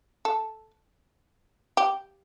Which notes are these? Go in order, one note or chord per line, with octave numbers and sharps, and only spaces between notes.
A4
G4